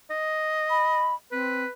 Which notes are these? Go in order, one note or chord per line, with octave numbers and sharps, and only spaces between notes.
D#5
B5
C4 B4